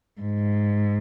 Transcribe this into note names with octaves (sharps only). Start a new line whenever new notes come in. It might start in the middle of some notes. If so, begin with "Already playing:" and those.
G#2